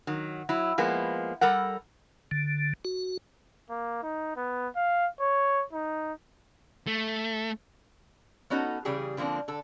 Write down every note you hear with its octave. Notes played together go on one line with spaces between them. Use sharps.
D#3 F#3
F#3 E4
F3 G#3 A#3 B3
G3 A4 A#4 F#5
D3
F#4
A#3
D#4
B3
F5
C#5
D#4
A3
B3 C#4 D#4 F#4 A4
C#3 E3 G3 G4 G#4
D3 F3 A#3 C4 D4
D3 A4